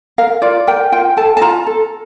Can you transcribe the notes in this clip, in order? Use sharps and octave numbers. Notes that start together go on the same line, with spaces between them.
A#4 F5
F4 D5
A#4 G5
F4 G5
A4 A5
A5
F4 A#5
A4